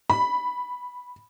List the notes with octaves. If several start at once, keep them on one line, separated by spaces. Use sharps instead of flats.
B5